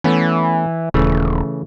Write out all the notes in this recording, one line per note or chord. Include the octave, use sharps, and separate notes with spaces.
E3 A3 B3 C#4
D#1 C#3 E3 A3